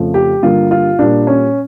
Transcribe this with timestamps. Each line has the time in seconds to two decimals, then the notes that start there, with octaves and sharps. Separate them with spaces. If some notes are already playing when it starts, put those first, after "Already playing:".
Already playing: F2 C#3 F3 A3
0.14 G4
0.43 G2 D3 G3 A#3 F4
0.71 F4
0.99 A#2 G3 A#3 D4
1.27 C#4